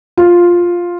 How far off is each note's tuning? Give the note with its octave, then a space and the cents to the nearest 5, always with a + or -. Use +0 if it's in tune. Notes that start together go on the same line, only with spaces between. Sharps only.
F4 +5